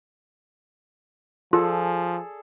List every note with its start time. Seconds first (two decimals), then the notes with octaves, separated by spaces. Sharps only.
1.53 F3 F4 G#4 A4 D5